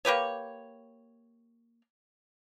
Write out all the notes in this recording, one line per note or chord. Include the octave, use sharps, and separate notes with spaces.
A#3 G4 B4 C#5